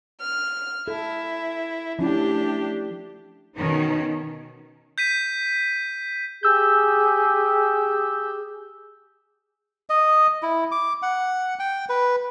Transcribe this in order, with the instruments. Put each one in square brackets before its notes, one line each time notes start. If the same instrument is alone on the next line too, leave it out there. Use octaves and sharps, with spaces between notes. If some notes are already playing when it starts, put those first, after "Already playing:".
[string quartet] F6
[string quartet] E4 [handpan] A4
[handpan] F3 C#4 E4 [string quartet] A3 D4 G4
[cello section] B2 D#3 C#4 D#4
[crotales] G6 B6 D#7
[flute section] G4 G#4 [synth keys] E6 G6
[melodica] D#5
E4
D6
F#5
G5
B4